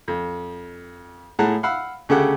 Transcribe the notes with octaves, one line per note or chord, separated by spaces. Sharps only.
F2
A2 G#4 F#5 A5 A#5
F5 F#5 B5 E6
D2 C#3 A3 G4 A4 F#5